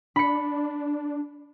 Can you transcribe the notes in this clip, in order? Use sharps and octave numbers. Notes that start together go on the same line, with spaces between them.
D4 B5 C#7